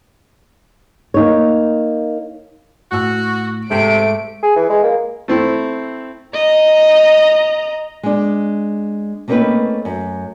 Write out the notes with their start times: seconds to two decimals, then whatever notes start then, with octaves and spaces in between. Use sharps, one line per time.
1.14 A#3 D#4 C#5
2.92 A2 F#4 E6
3.70 G#2 C3 A3 D7
4.43 G#4
4.56 E3
4.69 G#3
4.83 A#3
5.28 A3 C4 E4
6.34 D#5 A#5
8.03 G#3 D4
9.28 A3 A#3 C4 C#4 D#4 B4
9.85 F#2